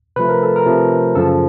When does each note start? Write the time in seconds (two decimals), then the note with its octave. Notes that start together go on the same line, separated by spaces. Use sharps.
0.16 C3 F3 A3 B4
0.29 A#4
0.43 A4
0.56 A#4
0.66 C3 F3 A3
1.15 F#2 C#3 F3 A4